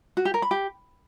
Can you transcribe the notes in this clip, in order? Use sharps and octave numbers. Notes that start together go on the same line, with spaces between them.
F#4
G4
A#4
B5
G4